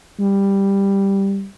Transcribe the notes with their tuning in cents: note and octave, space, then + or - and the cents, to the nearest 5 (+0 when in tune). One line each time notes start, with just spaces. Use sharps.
G3 +5